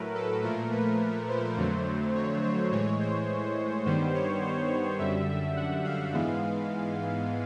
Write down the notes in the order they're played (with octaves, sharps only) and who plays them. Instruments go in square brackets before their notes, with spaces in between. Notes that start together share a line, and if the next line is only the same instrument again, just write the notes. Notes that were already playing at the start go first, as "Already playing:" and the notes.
Already playing: [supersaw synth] A2 F#3 A3 A#4 B4
A4
A#2 F3 A3 A#4
B4
C5
F2 D3 F#3 A3
C#5
C5
A2 E3 G#3 C#5
C5
G2 D#3 G3 B3 C5
C#5
C5
C#5
F#2 D3 G3 E5
E5
F#5
F5
G#2 E3 G#3 B3